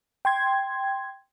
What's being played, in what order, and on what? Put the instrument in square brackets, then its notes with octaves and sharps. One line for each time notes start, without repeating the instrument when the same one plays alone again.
[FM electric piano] G5 C6 G#6